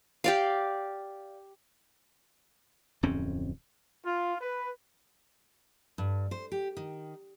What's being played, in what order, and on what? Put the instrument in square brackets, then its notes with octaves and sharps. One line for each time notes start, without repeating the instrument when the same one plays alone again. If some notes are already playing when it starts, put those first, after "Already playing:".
[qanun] G4 D5 F5
[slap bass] D1 F2 C4 C#4
[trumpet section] F4
B4
[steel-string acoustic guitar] G2
C5
G4
D#3